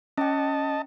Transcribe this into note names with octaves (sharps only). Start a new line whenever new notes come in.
C#4 D#5 G5 A5